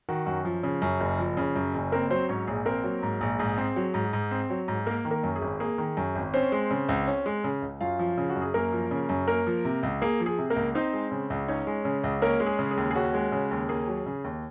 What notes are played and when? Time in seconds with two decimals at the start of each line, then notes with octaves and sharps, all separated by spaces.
0.09 D#3 F#4
0.26 F#2 F#4
0.45 F3
0.63 C#3
0.82 F#2
1.01 F#1
1.19 F3
1.37 C#3
1.56 F#2
1.74 F#1
1.92 A#3 C4 A#4
2.10 F#3 C4 C5
2.29 G#2 C#4 C#5
2.47 A#1 G#4
2.65 A#3 C4 A#4
2.84 F#3
3.03 G#2
3.21 A#1
3.39 G#2 G#4
3.58 C4
3.76 F#3
3.94 G#2
4.13 G#2
4.31 C4
4.50 F#3
4.68 G#2
4.86 A#3 A#4
5.05 D#3
5.11 A#3 A#4
5.23 F#2
5.36 G#4
5.42 G#1
5.60 A#3 G#4
5.78 D#3
5.97 F#2
6.15 G#1
6.34 C4 C#4 C5
6.52 G#3
6.71 C#3
6.89 C#2
7.07 C#4
7.26 G#3
7.44 C#3
7.62 C#2
7.81 F#2 F4 F5
7.99 F3
8.17 C#3
8.30 F#4
8.36 F#2
8.42 G#4
8.54 F#2 A#3 A#4
8.73 F3
8.91 C#3
9.09 F#2
9.28 A#3 A#4
9.47 F3
9.65 C3
9.83 C#2
10.02 A#3 G#4
10.20 F3
10.26 G#4
10.38 C3
10.50 A#3 A#4
10.56 C#2
10.75 C4 D#4 C5
10.93 G#3
11.12 C#3
11.30 C#2
11.48 C#4 D#4 C#5
11.67 G#3
11.85 C#3
12.04 C#2
12.22 A#3 C#4 A#4
12.40 G#3
12.47 G#4
12.59 C#3
12.71 G#4
12.77 D#2
12.91 G#4
12.95 C#4 F#4
13.14 G#3
13.32 C#3
13.51 D#2
13.69 A#3 G#4
13.88 F#3
14.06 C#3
14.24 D#2